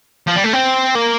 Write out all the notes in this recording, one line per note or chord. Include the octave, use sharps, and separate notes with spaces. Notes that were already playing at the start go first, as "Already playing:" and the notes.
F3
G3
A3
C4
A#3